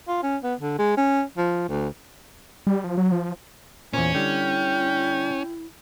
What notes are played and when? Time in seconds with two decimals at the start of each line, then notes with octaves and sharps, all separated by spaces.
0.08 F4
0.23 C#4
0.43 B3
0.60 D3
0.78 G#3
0.97 C#4
1.37 F3
1.69 D2
2.67 G3
2.84 F3
2.98 F#3
3.12 F3
3.93 E2 A#2 C#4 C5 G#5
4.14 D3 G3 E4 G5